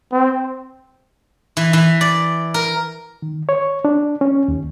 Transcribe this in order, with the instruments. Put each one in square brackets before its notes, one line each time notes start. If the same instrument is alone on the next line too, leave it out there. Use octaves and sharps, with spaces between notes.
[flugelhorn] C4
[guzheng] E3
E3
D5
A#4
[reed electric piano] D#3
C#5
D4
C#4
D#2